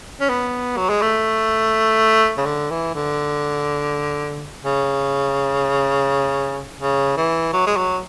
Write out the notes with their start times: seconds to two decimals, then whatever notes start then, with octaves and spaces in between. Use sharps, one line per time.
0.21 C#4
0.29 B3
0.77 F#3
0.89 G#3
1.02 A3
2.38 C#3
2.45 D3
2.70 E3
2.94 D3
4.64 C#3
6.80 C#3
7.17 E3
7.53 F#3
7.66 G#3
7.77 F#3